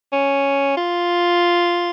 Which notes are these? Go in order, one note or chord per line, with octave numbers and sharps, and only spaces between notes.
C#4
F4